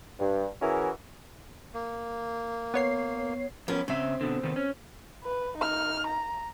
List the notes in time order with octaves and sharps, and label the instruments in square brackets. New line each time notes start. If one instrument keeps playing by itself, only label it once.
[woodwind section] G2
E3 C#4 E4 F#4 G#4 A#4
[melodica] A#3
[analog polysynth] B3 C#5 C7
[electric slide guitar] F2 C#4 [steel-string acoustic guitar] B3 A#4
[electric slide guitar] C#3 E5 [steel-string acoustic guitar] C4
[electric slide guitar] B2 D3
C3 D#3 B3
C#4
[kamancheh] B4
D#4 F6
A#5